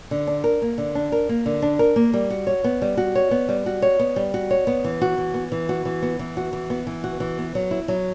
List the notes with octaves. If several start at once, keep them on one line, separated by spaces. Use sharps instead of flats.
D3
D4
A#4
A#3
D3
D4
A#4
A#3
D3
D4
A#4
A#3
G3
F#4
C#5
B3
G3
F#4
C#5
B3
G3
F#4
C#5
B3
G3
F#4
C#5
B3
E3
F#4
E3
B3
E3
F#4
E3
B3
E3
F#4
E3
B3
E3
F#4
E3
B3
F#3
E4
F#3